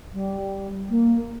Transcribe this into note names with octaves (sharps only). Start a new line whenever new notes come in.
G3
A#3